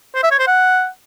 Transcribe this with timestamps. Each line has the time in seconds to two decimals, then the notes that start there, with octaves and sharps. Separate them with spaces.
0.15 C5
0.23 E5
0.31 C#5
0.39 C5
0.47 F#5